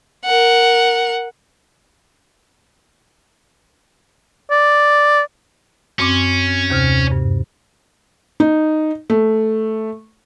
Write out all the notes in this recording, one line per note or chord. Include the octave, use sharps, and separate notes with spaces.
A#4 F#5
D5
F#2 C4 C#4 D6
D#2 C3 F6
G2
D#4
A3